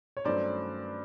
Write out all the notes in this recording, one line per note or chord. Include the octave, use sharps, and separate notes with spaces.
C#5
G2 D#3 F#3 A3 C#4 C5 D5